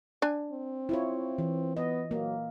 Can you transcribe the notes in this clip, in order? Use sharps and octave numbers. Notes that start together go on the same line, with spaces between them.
D4 G#5
C4
E4 F4 C#5
E3
B3 D#5
F#3 A#3